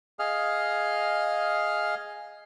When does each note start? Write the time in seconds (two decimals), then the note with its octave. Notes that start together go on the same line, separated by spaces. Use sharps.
0.19 G#4 D#5 F5 F6